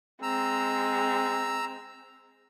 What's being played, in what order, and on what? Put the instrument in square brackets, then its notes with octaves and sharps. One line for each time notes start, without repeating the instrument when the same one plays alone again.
[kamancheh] G#3 C4 [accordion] A#5 E6